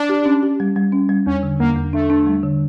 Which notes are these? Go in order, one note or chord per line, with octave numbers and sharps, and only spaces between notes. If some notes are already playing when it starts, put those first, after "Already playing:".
Already playing: D4
G4
C#4
G4
G3
G3
C#4
G3
E2 C#4
D3
E2 A#3
E2
A3 D4
D4
G3
D3